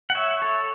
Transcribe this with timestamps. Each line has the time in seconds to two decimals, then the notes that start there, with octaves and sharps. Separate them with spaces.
0.10 F#5
0.15 C#5 E5
0.42 A4 C#5